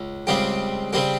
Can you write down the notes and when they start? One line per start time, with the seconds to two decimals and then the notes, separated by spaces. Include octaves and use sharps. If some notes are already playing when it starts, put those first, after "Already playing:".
Already playing: C#2
0.27 C#2 C#3 G3 C4 G4
0.93 C#3 G3 C4 G4